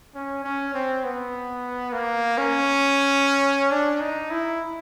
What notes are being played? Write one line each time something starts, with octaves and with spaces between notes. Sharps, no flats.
C#4
C#4
C4
B3
A#3
C#4
D4
D#4
E4